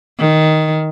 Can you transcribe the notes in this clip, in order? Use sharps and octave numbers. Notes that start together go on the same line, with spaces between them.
D#3